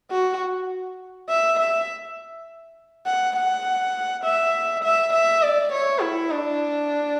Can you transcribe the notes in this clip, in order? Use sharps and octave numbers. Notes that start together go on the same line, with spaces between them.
F#4
E5
E5
F#5
F#5
E5
E5
E5
D5
C#5
E4
D4